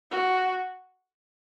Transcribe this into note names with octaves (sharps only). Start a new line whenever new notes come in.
F#4